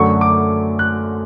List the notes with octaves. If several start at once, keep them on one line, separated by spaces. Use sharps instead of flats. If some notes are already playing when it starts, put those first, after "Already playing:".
Already playing: F#2 D3 F#3 A3 C#6
D6
F#6